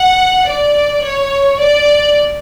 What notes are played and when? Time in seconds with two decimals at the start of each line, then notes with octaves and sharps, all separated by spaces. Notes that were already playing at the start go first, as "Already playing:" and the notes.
Already playing: F#5
0.47 D5
1.03 C#5
1.59 D5